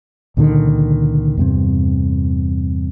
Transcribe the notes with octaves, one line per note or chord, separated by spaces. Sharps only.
C#2 A#2 D3 D#3
E2 G2 C3